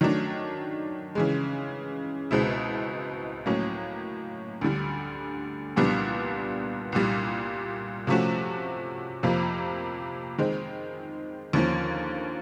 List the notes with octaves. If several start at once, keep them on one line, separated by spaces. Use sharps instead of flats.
D#3 F#3 A3 D4
C#3 E3 G#3
C#2 B2 G#3 C4 E4
A2 F#3 A#3 C#4
D2 D3 G3
C2 A#2 G3 B3 D4
C2 A#2 G3
C3 F3 A3 C#4 F#4
F2 C3 F3 A#3
D#3 G#3 C4
D#2 D3 F3 A#3 C#4